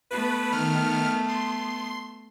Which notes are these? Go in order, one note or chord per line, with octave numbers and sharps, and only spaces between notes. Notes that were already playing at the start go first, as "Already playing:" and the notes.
A3 B3 B4
D#3 F6
C6